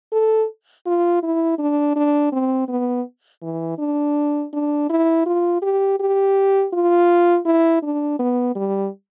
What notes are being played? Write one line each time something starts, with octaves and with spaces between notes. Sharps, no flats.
A4
F4
E4
D4
D4
C4
B3
E3
D4
D4
E4
F4
G4
G4
F4
E4
D4
B3
G3